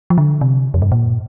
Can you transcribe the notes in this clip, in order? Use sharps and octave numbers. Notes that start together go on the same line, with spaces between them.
F3
D3
C3
F2
G2
A#2